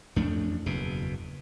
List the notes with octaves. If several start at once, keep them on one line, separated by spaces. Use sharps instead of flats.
A1 F2 A3 D4
F#1 E2 B2